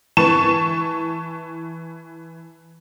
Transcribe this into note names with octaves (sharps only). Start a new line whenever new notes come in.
E3 A5 C#6 E7